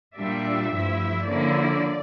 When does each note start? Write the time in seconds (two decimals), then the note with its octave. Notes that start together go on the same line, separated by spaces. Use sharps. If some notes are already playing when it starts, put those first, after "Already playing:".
0.16 A#2 G3 D4 E5
0.72 G2 F3 A3 E4
1.26 D3 F3 A#3 C#4 E4 D5